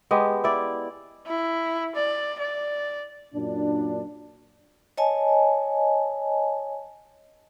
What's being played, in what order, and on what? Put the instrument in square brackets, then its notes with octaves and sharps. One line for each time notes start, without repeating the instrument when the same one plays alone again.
[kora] G#3 B3 G4
E4 D5
[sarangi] E4
D5
D5
[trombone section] F#2 A#2 D4
[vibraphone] C#5 D#5 G#5 A5